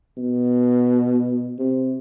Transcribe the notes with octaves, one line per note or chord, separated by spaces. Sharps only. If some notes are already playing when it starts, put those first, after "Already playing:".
B2
C3